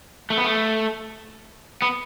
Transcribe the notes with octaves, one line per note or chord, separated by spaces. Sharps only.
A3
B3
A3
B3